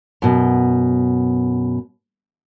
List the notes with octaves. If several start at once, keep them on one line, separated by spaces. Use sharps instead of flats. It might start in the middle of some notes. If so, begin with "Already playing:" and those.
F#2 B2